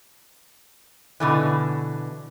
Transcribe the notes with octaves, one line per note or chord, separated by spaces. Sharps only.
B2 D3 E3